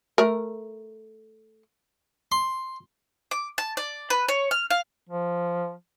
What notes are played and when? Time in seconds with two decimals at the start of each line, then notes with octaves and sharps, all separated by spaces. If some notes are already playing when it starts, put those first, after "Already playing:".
0.18 A3 A#4
2.32 C6
3.31 D6
3.58 A5
3.77 D5
4.10 B4
4.28 C#5
4.51 F6
4.70 F5
5.09 F3